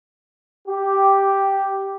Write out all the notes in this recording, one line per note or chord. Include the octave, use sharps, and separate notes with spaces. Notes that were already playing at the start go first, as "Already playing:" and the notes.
G4